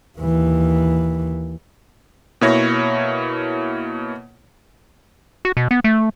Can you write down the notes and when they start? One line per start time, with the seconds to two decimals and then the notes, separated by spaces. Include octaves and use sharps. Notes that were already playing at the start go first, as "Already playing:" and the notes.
0.18 D#2 E3
2.41 B2 A#3 E4 C#5 C#6 A#6
5.45 F#4
5.57 B2
5.71 B3
5.84 A3